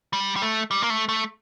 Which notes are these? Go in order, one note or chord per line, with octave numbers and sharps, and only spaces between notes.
G3
G3
A3
G3
A#3
A3
A3